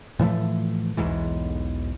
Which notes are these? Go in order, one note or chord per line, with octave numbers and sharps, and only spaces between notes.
A2 E3 F3 A3
B1 E2 G#2 E3